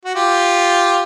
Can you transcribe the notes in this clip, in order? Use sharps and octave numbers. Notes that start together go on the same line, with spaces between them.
F#4
F4 G4